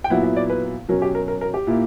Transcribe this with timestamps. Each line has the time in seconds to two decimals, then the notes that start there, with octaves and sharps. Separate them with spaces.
0.04 G5
0.10 A#2 F#3 B3 E4 F#5
0.23 E5
0.36 D5
0.50 B4
0.88 B2 F#3 C#4 A#4
1.02 G4
1.15 A#4
1.28 A#4
1.41 A#4
1.54 G4
1.67 A#2 A#3 E4